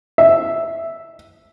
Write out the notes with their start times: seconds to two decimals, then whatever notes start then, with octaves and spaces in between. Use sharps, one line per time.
0.18 E5